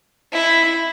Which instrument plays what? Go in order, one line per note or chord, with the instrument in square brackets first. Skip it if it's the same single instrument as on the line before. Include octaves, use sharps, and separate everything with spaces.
[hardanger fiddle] E4